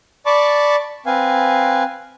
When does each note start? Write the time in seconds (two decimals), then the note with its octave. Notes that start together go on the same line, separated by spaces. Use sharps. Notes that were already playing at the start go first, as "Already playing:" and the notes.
0.26 D5 A5 B5 C#6 D6
1.06 C4 B4 F5 G#5